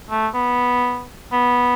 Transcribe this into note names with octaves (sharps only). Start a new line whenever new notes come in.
A3
B3
B3